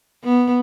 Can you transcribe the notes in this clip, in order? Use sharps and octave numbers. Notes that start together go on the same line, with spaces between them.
B3